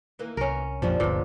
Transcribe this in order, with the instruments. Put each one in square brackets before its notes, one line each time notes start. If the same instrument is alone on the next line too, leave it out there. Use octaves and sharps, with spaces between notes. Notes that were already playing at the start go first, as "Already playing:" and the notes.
[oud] D#2 E3 A#3
[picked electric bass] C2 [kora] C#4 A#4
[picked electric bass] A#1 F2 A#2 [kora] F3 [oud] G3 C#4 D4
[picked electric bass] G1 D2 [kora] A#2 [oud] G#3 B3